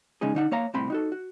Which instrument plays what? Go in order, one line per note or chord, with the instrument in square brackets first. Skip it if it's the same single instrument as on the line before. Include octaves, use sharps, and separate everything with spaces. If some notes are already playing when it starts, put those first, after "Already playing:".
[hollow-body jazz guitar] C#3 G#3 C#4 D#4 G#4
D3 D#4 F#5
A#3 C#5 F5 A#5
C2 A2 C4 G5 B5 C6
D#4 F#4 A4
F#4